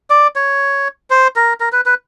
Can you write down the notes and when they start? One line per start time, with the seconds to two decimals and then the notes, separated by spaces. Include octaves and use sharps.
0.10 D5
0.36 C#5
1.10 C5
1.36 A#4
1.60 A#4
1.72 B4
1.86 B4